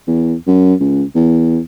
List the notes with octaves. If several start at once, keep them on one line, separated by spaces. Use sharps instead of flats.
E2
F#2
C#2
E2